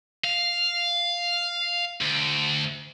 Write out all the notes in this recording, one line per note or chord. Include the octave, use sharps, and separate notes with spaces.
F5
D2